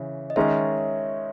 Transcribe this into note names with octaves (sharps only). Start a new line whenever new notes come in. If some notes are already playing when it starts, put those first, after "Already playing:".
Already playing: C#3 E3 C#5 E5
D#5
D#3 G#3 C#4 G#4 C#5 E5